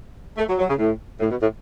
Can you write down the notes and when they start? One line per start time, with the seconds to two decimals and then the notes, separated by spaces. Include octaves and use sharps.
0.38 A3
0.48 F#3
0.59 F#3
0.69 C#3
0.79 A2
1.20 A2
1.30 B2
1.41 A2